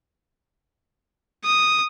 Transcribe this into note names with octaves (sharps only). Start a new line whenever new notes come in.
D#6